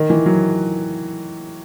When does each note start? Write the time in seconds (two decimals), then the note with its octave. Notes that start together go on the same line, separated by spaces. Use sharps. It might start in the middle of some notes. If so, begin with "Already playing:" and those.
Already playing: D#3
0.10 E3
0.26 F#3